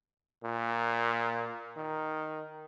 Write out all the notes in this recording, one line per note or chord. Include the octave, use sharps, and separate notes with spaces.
A#2
D#3